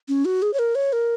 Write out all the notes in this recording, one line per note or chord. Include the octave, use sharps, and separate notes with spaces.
C#4
F#4
G#4
C#5
A#4
C#5
A#4